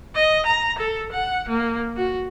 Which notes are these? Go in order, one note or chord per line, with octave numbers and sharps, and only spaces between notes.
D#5
A#5
A4
F#5
A#3
F#4